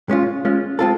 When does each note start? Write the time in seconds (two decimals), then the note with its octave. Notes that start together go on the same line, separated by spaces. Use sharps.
0.09 G#3 C#4 F4
0.45 G#3 C#4 F4
0.79 G#3 C4 F4 A4